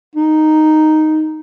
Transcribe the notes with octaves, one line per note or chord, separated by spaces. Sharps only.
D#4